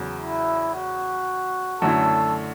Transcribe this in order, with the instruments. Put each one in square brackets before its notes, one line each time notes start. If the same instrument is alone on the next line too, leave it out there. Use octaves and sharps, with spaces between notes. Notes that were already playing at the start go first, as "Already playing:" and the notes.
Already playing: [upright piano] E2 C#3 F#3
[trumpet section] E4
F#4
[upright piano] F#2 D3 A3 C#4 E4 [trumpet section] A4